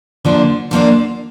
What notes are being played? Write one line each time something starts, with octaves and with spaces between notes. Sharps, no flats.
D3 F3 A#3 D4
D3 F3 A#3 D4